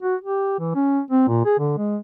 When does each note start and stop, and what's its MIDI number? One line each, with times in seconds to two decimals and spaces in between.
0.03 0.16 66
0.22 0.58 67
0.59 0.74 52
0.75 1.01 61
1.11 1.25 60
1.28 1.45 46
1.46 1.55 68
1.59 1.76 50
1.78 1.97 56